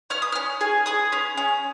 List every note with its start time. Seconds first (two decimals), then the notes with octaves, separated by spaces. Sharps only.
0.10 C#4 F6
0.22 D#6
0.32 C#4 F6
0.61 G#4
0.86 G#4 D#6
1.12 C#4
1.37 C#4